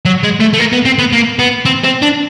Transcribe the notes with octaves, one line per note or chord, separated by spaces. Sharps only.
F#3
G#3
A3
A3
A#3
B3
C4
B3
A#3
B3
C4
C4
D4